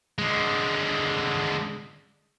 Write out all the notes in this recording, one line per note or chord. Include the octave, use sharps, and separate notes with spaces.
D3 G#3